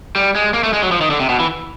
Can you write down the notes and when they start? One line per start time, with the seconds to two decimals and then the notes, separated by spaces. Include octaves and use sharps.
0.15 G3
0.35 G#3
0.54 A#3
0.63 A3
0.73 G#3
0.83 F#3
0.92 F3
1.01 D#3
1.10 D3
1.20 C3
1.29 B2
1.40 E3